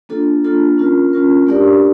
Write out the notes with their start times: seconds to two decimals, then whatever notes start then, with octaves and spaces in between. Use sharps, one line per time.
0.09 A#3 D4 F4 A4
0.44 A#3 D4 F4 A4
0.78 C#4 F4 A#4
1.13 C#4 F4 A#4
1.47 A3 D4 G4 A#4 D5